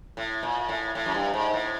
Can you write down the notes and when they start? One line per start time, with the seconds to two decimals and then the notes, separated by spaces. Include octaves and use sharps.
0.17 A2
0.43 A#2
0.69 A2
0.95 A2
1.06 F#2
1.14 G2
1.34 G#2
1.54 A2